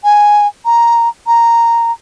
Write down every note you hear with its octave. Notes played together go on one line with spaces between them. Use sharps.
G#5
A#5
A#5